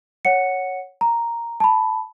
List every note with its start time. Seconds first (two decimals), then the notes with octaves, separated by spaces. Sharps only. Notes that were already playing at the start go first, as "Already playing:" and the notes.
0.25 C#5 F#5 C#7
1.01 A#5
1.60 A5 B5